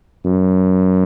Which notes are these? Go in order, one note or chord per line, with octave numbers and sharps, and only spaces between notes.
F#2